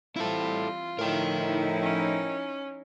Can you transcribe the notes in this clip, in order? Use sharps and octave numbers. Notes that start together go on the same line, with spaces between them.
E3 G3 C4 E4 F4 A4
A2 F3 D#4 E4 A#4 G5
C#4